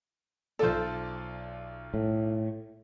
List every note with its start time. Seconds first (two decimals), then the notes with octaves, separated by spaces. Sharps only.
0.59 B1 F4 A4 C5 D5
1.94 A2